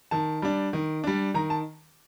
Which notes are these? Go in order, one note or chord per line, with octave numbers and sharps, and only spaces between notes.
D#3 A5
G3 D4
D#3
G3 D4
D#3 A#5
A5